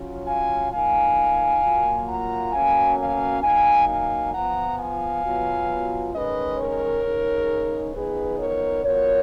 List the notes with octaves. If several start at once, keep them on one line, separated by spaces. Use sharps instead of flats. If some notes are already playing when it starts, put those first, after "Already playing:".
Already playing: F#3 C#4 F4
F5 G#5
F3 A#3 D#4 F5 G#5
A#2 F#3 A#3 F4
F#5 A#5
B2 F#3 A#3 C#4 F5 G#5
F5 G#5
F#3 A#3 D#4 F5 G#5
F5 G#5
F3 B3 F4 F#5 A#5
F5 G#5
B2 F#3 B3 F4
D#3 G#3 C#4 B4 D#5
A#4 C#5
C#3 G#3 D#4
F3 B3 D#4 G#4 B4
A#4 C#5
F#3 B3 F4 A#4 C#5